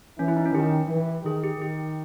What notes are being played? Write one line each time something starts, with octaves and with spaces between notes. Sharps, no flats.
E3 C#4
E4
D#4
C#4
D#3 G4
E3
D#3 G#4
G4
D#3 G4